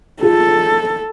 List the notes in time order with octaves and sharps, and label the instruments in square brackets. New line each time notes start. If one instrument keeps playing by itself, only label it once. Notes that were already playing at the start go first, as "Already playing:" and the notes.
[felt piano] F4 G#4 [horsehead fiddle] A4